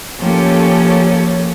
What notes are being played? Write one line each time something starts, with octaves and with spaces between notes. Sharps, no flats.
F3 A#3 C#4 G4 A4 C#5